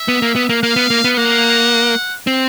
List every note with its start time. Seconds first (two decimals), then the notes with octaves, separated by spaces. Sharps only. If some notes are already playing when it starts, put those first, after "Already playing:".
Already playing: E5
0.08 B3
0.22 A#3
0.36 B3
0.49 A#3
0.63 A#3 F5
0.76 B3
0.90 A#3
1.04 B3
1.17 A#3 F#5
2.27 C4